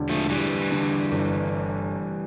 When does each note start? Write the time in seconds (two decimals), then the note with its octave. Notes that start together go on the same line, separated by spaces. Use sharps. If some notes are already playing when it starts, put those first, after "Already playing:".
Already playing: E1 D3
0.09 F3 A3
0.29 E2 E3 G3
0.71 D3
1.12 G1